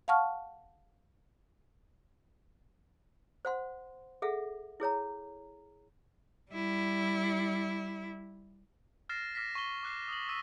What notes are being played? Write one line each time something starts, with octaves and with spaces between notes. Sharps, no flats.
F5 F#5 A5 C#6 F6
C5 F#5 C6
G#4 A4 E5 F#5
E4 G#4 C#5 A#5
G3 E4
F6 A6 A#6 C7 E7
D6 F6 A#6 B6
C#6 G7
D6 F#6 C7
D#6 F#7
E6 A#6 B6 D#7